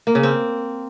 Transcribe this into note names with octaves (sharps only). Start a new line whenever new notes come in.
A#3
C#3
C4